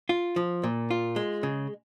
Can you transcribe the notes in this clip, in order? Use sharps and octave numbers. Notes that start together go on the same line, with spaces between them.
F4
F3
A#2
F4
G#3
C#3